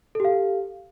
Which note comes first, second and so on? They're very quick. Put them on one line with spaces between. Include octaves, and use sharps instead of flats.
A4 G4 F5